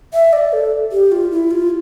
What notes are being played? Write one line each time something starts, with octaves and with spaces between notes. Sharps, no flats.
E5
D5
A4
G4
F4
E4
F4